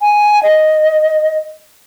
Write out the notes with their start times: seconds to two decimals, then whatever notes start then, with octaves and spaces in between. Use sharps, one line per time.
0.01 G#5
0.43 D#5